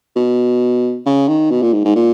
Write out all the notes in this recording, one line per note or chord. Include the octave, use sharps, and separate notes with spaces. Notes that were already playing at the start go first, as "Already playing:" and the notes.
B2
C#3
D#3
B2
A#2
G#2
G#2
A#2